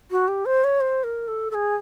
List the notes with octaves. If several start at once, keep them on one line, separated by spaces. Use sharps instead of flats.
F#4
G4
C5
C#5
C5
A#4
A4
A4
G#4